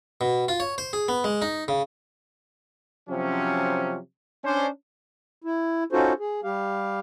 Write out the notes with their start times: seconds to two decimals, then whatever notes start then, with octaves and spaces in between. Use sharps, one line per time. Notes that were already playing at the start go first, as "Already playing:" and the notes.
0.21 B2
0.48 F4
0.60 C#5
0.78 C5
0.93 G#4
1.08 B3
1.24 G#3
1.42 D#4
1.68 C#3
3.10 C3 F3 F#3 C#4
4.45 C#4 D4 C5
5.44 E4
5.92 C#4 D#4 F4 F#4 A4 C5
6.19 G#4
6.44 G3 G4 F5